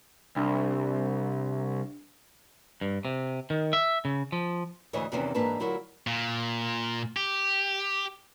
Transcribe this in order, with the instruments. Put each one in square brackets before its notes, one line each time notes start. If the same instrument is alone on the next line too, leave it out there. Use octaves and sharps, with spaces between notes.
[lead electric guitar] C2 [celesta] D4
[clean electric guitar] G2
C3
D#3
E5
C#3
F3
[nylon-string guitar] D2 G#2 E3 C#5 D#5
E2 C3 D#3 E3 B3 C#4
G#2 E3 A#3 D4 B4 A5
D2 F#3 E4 F4 A#4
[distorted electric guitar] A#2
G4